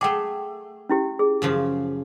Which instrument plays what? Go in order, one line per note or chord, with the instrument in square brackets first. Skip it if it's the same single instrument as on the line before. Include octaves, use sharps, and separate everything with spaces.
[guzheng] A3 G#4 [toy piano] F#5 G5 D6
[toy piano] C#4 E4 G4
G#4
[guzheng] F#2 C#3 F3